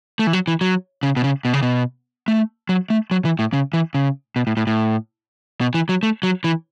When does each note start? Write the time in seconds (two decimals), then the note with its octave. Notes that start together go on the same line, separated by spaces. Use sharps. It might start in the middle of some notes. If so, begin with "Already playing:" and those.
0.19 A3
0.27 E3
0.33 F#3
0.48 E3
0.61 F#3
1.03 C#3
1.17 B2
1.24 C#3
1.45 B2
1.53 C#3
1.62 B2
2.28 A3
2.69 F#3
2.90 A3
3.11 F#3
3.25 E3
3.39 A2
3.53 C#3
3.73 E3
3.95 C#3
4.36 B2
4.47 A2
4.57 A2
4.67 A2
5.61 B2
5.74 E3
5.89 F#3
6.03 A3
6.23 F#3
6.44 E3